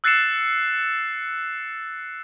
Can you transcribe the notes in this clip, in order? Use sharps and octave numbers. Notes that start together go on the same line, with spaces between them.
E6 F#6 A6 C7 C#7 E7